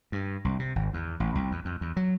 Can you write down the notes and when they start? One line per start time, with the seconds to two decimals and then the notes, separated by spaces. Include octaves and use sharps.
0.12 G2
0.45 C2
0.59 C3
0.76 G#1
0.94 E2
1.20 A1
1.35 C2
1.52 E2
1.65 F2
1.81 E2
1.97 F#3